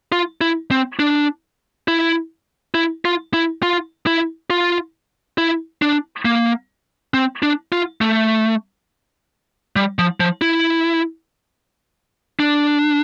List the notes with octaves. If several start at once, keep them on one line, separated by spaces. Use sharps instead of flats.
F4
E4
C4
D4
E4
E4
F4
E4
F4
E4
F4
E4
D4
A#3
C4
D4
F4
A3
G3
F3
F3
E4
D4